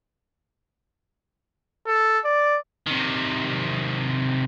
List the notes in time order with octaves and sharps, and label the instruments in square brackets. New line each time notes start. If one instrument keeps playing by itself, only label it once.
[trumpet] A4
D5
[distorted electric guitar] C3 D#3